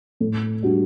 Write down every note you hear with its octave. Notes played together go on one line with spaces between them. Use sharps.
A2
G3 D4 F#4